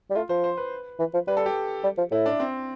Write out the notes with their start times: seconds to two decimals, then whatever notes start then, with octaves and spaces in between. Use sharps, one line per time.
0.10 G3
0.15 A3 F4
0.29 F3 C5
0.44 C5
0.57 B4
0.99 E3
1.14 F3
1.28 G3 B4
1.37 A4
1.46 G4
1.84 G3
1.98 F3
2.11 A2 E4
2.26 D4
2.40 C4